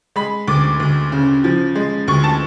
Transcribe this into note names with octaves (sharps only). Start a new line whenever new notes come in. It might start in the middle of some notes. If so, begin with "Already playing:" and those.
G#3 B5
D2 D6
D2
C#3
F3
G#3
D2 C#6
A5